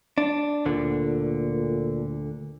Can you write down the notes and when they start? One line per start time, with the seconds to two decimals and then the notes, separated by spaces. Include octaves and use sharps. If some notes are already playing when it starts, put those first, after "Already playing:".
0.18 D4
0.65 D2 A#2 D3